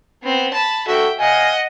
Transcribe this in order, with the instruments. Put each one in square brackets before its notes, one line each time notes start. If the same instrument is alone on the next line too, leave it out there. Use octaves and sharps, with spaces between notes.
[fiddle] B3 C4
A5 B5
[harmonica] F#4 A4 [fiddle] E5 G5
[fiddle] D#5 F#5 [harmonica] F5 G#5